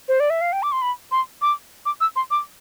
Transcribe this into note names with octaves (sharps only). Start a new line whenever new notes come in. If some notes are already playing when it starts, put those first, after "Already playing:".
C5
D5
E5
F5
G5
D6
C6
B5
C6
D6
D6
E6
C6
D6